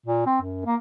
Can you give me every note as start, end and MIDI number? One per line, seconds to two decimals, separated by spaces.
0.06 0.22 46
0.26 0.39 60
0.41 0.61 42
0.65 0.76 58